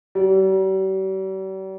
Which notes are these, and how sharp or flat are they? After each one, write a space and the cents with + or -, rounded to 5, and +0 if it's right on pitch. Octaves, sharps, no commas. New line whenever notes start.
G3 -45